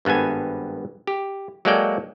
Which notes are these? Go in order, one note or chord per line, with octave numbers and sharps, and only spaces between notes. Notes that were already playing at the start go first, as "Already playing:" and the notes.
G#1 G2 B3 A4 G#5
G4
F#3 G#3 A#3 A4 D5 G5